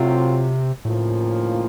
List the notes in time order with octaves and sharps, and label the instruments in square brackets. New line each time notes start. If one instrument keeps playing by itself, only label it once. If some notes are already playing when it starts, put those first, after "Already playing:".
Already playing: [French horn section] A2 F#3 C4 F4 [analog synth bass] C3
[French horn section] D#2 C#3 F3 A#3 F4 [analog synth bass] A2